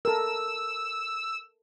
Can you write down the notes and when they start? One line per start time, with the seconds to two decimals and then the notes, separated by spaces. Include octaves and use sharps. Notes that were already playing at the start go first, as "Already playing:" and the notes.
0.05 A4 A#4 E6